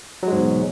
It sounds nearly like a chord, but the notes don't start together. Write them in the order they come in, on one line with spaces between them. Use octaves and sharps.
F#3 G#3 G#2 E2 B2